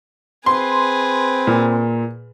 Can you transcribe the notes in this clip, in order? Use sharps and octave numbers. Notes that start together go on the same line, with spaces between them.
C4 G#4 B4 C6
A#2